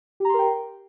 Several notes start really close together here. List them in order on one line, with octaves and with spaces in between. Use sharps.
G4 A#5 C6 A#4 G5